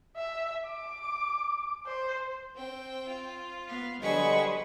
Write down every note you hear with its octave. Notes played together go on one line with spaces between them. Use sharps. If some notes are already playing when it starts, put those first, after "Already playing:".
E5
D6
C5
C4 G5
F4
B3 F5
D3 F#3 G3 G#4 B4 C5 D#5 C#6